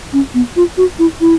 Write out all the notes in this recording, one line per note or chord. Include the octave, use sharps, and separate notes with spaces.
C#4
B3
F4
F#4
E4
E4